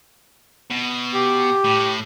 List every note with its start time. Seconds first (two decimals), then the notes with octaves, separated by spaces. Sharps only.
0.71 B2
1.14 G4
1.64 A2